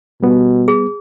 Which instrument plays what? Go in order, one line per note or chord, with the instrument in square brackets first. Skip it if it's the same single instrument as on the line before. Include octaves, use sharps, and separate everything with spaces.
[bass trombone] B2 [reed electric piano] G3 B3
[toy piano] G#4